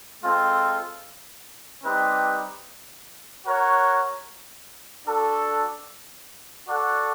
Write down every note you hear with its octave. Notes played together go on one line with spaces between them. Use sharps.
G#3 C4 F4 A4
G3 C4 D#4 G4 B4
F#4 A#4 C#5 F#5
D4 F#4 A4
F#4 A4 D5 F#5